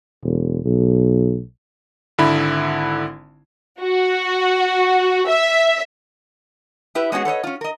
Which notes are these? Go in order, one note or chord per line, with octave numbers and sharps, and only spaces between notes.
E1
B1
G#1 D3 E4 B5
F#4
E5
E4 G4 B4 E5
G#3 B3 C#4 F#4 G#4
A4 B4 C#5 D#5
C#4 F4
A#4 D#5